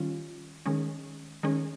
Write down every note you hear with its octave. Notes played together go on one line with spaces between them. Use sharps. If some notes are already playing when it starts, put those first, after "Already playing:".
Already playing: D#3 G3 C#4 F4
D#3 G#3 C#4
D#3 G#3 C#4